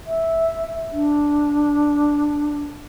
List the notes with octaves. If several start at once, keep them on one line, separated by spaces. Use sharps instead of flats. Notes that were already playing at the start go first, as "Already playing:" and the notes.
E5
D4